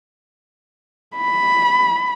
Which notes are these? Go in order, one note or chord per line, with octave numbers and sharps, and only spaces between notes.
B5